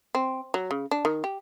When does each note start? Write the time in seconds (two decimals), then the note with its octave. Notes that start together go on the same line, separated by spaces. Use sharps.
0.15 C4
0.54 F#3
0.71 C#3
0.91 D4
1.05 D#3
1.24 G4